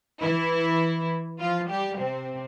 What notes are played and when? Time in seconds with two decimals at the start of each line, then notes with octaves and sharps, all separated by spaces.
0.22 E3 E4
1.40 F3 F4
1.70 G3 G4
2.00 C3 C4